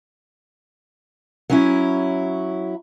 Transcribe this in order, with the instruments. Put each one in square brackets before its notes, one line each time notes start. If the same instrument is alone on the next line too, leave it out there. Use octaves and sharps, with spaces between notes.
[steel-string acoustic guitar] F#3 C#4 E4